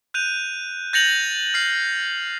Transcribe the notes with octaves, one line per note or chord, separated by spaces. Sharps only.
F#6 G6 D#7 F7
G6 A6 A#6 C#7 F7 F#7
F6 C7